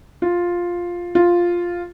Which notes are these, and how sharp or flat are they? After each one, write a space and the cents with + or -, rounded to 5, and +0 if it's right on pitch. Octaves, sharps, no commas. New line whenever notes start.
F4 +5
F4 +0